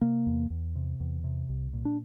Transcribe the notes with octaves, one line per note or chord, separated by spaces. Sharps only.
C3 A#3
E2
E2
C3
E2
C3
C2
A#2
D4